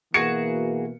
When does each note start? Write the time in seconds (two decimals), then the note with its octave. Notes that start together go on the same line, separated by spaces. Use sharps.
0.14 B2 E3 A#3 F#4 G#4 C#7